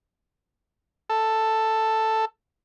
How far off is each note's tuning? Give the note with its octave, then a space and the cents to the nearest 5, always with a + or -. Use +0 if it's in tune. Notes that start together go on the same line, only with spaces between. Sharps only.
A4 +5